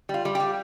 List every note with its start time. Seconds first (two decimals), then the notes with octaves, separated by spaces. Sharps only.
0.09 G3 F4
0.25 G3
0.35 G4
0.40 G3